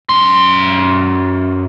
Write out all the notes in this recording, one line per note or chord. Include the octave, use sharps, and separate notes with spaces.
F#2 C6